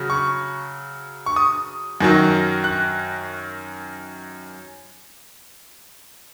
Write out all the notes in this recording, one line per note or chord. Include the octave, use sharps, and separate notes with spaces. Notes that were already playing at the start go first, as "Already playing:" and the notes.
Already playing: C#3 F#3
C#6
C#6
D#6
F#2 D#3 F#3
F#6